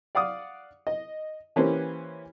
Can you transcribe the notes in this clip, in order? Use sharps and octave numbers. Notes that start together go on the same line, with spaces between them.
D5 F5 F#5 D6 D#6
D#5
E3 A#3 C#4 G4 B4 C5